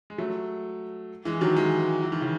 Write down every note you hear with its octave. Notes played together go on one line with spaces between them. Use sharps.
G#3
F#3 A3
E3 G#3
D#3 F#3
E3 G#3
E3
D#3
C#3 E3